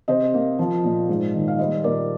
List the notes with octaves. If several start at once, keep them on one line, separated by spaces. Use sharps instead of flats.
C3 C5 D#5
A#3
F3
A#2
G#2
D#3
F5
G3 C5 D#5
A#2 A#4 D5